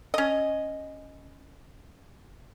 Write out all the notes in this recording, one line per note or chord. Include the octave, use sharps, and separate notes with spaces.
C#4 D#5